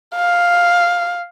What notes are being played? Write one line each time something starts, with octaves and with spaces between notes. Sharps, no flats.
F5